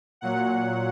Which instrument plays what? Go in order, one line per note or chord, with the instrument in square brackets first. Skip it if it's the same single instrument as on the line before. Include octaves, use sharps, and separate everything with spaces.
[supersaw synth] A#2 F#3 F#5